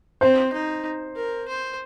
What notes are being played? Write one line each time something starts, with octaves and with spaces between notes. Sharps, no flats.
C4 C5
D#4
A#4
C5